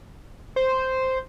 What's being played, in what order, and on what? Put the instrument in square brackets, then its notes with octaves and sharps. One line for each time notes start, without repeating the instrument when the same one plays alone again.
[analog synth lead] C5